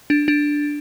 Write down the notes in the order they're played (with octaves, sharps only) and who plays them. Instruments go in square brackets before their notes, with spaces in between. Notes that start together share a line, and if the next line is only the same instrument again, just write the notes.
[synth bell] D4
D4